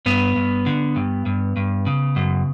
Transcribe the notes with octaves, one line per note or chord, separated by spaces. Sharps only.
G2 B3
G2
D3
G2
G2
G2
C#3
F#2